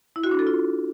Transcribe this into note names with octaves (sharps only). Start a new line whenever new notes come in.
E4
F#4
D4
A4
F4